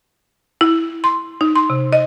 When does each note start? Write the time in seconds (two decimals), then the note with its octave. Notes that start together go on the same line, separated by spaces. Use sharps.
0.61 E4
1.04 C6
1.41 D#4
1.56 C6
1.70 C3
1.93 D#5